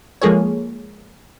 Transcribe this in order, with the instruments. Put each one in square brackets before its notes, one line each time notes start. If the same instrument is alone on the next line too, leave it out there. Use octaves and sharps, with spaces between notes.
[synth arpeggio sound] F3 G#3 A#3 G#4 A4 C#5